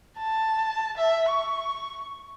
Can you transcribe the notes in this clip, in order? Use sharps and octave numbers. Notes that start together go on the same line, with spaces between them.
A5
E5
C#6